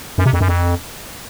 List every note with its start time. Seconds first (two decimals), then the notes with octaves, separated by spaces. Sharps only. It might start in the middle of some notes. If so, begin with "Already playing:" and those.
0.18 F#2
0.26 C3
0.33 F2
0.41 F#2
0.48 F2